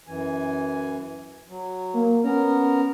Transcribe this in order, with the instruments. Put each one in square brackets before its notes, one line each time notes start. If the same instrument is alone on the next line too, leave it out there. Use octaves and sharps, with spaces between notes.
[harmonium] F#2 E3 G#5
F#3
[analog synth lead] A#3
[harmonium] B3 A#4 A#5 [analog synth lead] C#4